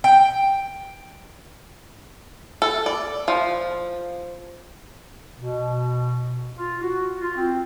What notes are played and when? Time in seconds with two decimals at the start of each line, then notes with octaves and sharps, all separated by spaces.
0.04 G5
2.62 A4
2.86 D5
3.28 F3
5.38 B2
6.56 F4
6.82 F#4
7.20 F4
7.36 C4